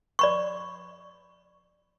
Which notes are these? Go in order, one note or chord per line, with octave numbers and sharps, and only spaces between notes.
D5 B5 C#6